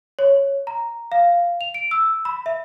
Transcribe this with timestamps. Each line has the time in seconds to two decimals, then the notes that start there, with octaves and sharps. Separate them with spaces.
0.19 C#5
0.67 A#5
1.12 F5
1.61 F7
1.74 D7
1.91 E6
2.25 B5
2.46 E5